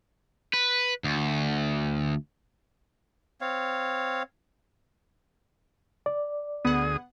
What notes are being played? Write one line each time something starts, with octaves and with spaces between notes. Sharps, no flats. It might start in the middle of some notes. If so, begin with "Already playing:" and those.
B4
D2
C4 C#5 F5
D5
D2 B3 G#4 F#5 D#6